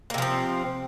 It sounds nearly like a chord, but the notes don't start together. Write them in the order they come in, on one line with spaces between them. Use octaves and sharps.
A#3 C3 F3 C4